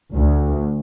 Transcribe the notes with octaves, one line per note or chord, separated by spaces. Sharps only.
D2